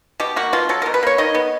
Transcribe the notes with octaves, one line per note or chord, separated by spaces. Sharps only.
B2 G4
A#3 F#4
B2 F4
F#3 A4
B2 A#4
B4
A#3 C#5
D#3 D#5
B3